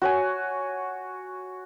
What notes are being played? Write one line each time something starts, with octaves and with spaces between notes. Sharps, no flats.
F#4 C#5 G#5